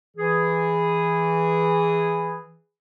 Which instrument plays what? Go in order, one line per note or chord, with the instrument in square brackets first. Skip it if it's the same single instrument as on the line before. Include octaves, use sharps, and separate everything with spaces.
[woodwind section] E3 G#4